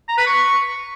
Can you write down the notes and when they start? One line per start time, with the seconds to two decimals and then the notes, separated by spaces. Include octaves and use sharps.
0.08 A#5
0.17 B4
0.26 C#6